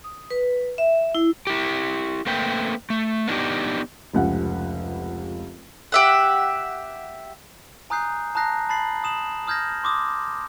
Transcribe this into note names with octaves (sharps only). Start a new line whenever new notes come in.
D#6
B4
E5
E4
E4 G4
A3 A#3 C4 B4 G5
A3
B3 D4 D#4 F4 G4
F1 C#2 C3 F#5
G4 E5 F#5
G#5 A#5 D#6 F#6 G6 C7
A5 A#5 D#6 F#6 A#6 C7
A5 B5 A6 C7 F#7
D#6 E7 F#7
D#6 F6 G6 G#6 A#6
C6 D6 D#6